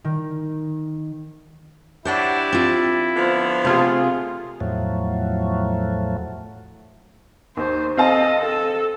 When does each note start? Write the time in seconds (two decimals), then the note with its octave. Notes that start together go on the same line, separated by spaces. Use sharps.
0.04 D#3
2.05 G3 D4 E4 C5 C#5 F#5
2.52 C4 F4
3.16 D3 F3 B3
3.65 C3 A3 F4 G#4
4.61 E2 A2 F3 F#3 A3
7.57 D#2 C5
7.97 C4 A4 D#5 F5 A5
8.39 A4